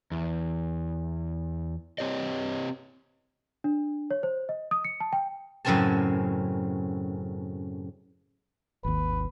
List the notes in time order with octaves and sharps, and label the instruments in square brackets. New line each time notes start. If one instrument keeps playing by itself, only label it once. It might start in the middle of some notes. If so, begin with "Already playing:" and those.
[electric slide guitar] E2
C4 G4 C#5 D#5
[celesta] D4
C#5
C5
D#5
D#6
C#7
A5
G5
[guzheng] F#2 A2 C#3 C4 G#5 A5
[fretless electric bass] G#1 D#2 [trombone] B4